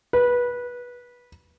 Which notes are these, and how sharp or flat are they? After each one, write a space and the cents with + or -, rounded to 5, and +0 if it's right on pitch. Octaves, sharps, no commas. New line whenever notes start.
B4 -20